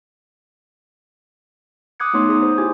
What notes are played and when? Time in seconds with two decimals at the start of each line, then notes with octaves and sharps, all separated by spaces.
2.00 D6 D#6 F#6 G#6 C#7
2.14 A3 B3 D#4 C#5 C6 D6
2.29 G#4 D#6
2.42 C5
2.58 E4 G4 G#5 D6 G#6